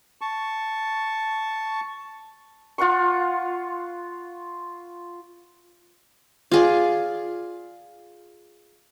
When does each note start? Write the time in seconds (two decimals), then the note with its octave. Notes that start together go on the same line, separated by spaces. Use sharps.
0.21 A5 C#6
2.78 F4 F#5 C6 C#6
6.51 F4 G#4 D5